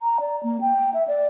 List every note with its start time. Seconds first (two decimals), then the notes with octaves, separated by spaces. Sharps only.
0.02 A#5
0.20 D5
0.43 A#3
0.61 G5
0.94 E5
1.08 D5